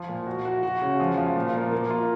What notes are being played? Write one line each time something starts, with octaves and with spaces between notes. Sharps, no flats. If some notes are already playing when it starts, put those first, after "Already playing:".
Already playing: F3
A#2
F#4
F#4
F#4
C#3
F3
F3
A#2
A#3
A#3
F4